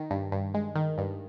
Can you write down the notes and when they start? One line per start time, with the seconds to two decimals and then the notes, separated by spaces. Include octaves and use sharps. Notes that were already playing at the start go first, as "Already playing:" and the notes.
Already playing: D#3
0.11 G2
0.32 G2
0.54 G#3
0.75 D#3
0.98 G2